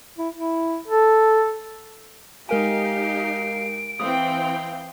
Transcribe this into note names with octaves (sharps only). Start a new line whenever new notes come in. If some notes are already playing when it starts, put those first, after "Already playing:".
E4
E4
A4
G#3 D#4 G4 A#4 F5 G#5 D7
E3 C4 F5 G5 D#6